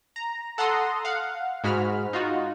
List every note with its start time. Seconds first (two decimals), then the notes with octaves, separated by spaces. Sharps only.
0.16 A#5
0.58 A4 F#5 A#5 C6 D#6
1.05 F5 F#5
1.64 G#2 G#3 F#4 B5 F6
2.13 D#4 F4 F#4